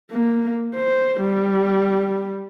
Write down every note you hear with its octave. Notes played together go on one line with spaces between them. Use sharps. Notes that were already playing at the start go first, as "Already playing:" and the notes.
A#3
C5
G3